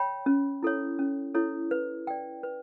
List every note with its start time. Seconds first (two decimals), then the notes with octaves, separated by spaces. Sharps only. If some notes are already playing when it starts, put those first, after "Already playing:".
Already playing: C#5 G5 B5
0.26 C#4
0.63 E4 A4 C#5
0.99 C#4
1.35 E4 A4 C#5
1.71 B4
2.07 D5 G5
2.43 B4